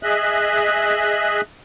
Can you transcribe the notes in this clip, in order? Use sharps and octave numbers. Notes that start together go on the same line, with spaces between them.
G#4 D#5 E5 F#6